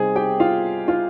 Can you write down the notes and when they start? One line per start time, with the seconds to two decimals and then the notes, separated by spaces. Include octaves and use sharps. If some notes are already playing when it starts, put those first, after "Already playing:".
Already playing: C3 G3 C4 D#4 G#4 G#5
0.16 G4 G5
0.40 F4 F5
0.88 F4 F5